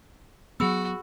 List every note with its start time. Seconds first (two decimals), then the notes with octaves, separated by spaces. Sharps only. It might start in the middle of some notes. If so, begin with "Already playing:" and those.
0.60 F#3 B3 F#4 G#4 B5 E6